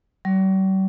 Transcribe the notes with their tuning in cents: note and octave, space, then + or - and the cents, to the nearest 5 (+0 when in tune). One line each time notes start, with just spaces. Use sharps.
G3 -45